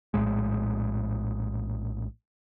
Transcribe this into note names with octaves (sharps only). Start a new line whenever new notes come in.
A#1 F#2 A2 G#3